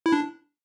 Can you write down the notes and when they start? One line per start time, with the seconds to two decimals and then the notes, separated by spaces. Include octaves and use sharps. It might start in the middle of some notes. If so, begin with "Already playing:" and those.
0.06 E4
0.12 D4